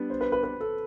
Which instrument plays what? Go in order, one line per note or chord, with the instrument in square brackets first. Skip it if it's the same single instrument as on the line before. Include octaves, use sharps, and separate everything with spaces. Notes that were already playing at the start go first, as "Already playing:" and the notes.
Already playing: [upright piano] G3 B3 D4
[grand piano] C5
B4
B4
B4
A4